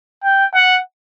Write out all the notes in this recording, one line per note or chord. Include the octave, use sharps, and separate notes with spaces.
G5
F#5